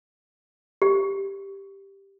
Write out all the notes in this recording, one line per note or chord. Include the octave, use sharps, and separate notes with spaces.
G4